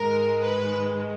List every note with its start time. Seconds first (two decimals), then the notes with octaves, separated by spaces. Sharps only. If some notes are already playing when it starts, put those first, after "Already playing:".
Already playing: G#2 D#3 G#3 A#4
0.41 B4